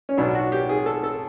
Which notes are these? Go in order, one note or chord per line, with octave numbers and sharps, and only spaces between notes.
C#4
B1 B2 F#3 D4
F#4
G4
G#4
A4
A4